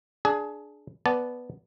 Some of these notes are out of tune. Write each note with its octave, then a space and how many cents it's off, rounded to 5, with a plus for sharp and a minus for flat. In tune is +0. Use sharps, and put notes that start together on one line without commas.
D4 +0 G#4 +20
B3 +0 D5 +0 A5 -20